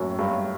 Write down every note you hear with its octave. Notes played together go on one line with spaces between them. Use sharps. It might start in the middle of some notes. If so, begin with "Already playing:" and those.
Already playing: F#2 A2
G2